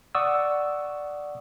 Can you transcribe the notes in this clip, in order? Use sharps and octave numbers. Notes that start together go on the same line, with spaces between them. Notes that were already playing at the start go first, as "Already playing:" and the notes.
D5 F#5 C#6 D#6 E6